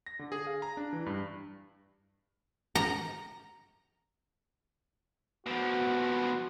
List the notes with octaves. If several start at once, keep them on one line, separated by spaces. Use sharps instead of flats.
A#6
D3
G#4
F5
A#5
D4
E3
G2
A#5
B2 F3 F#4